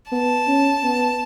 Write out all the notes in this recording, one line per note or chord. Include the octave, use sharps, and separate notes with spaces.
B3 A5
C#4
B3